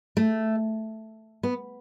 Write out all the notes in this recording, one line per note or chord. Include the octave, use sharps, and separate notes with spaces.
A3
B3